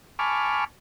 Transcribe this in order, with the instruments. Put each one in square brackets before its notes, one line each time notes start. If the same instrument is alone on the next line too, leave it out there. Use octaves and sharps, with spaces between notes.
[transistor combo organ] G#5 A5 B5 C#6 D6 F6